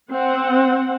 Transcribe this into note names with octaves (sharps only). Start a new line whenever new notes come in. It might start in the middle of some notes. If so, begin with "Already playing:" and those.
C4 F#5